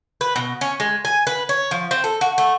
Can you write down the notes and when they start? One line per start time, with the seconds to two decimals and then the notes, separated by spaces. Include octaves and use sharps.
0.21 B4
0.36 B2
0.61 C#4
0.80 G#3
1.05 G#5
1.27 B4
1.49 C#5
1.71 F3
1.91 C4
2.04 A4
2.21 F#4
2.38 A3